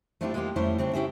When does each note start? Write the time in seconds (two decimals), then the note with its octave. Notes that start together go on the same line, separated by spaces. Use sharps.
0.21 A3 C4 D4 E4 F4 G4
0.34 G#3 A#3 E4 F4 G4
0.56 F2 G3 A3 C#4 E4 C5
0.78 C#3 C4 D4
0.93 C#4 E4 G4 G#4 E5